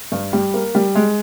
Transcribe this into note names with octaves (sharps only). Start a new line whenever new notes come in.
G2
G3
A#3
G3
G#3